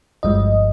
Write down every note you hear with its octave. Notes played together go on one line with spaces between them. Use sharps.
G1 G2 F3 G#3 D#5